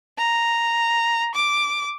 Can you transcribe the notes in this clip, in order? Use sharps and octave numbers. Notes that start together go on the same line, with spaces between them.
A#5
D6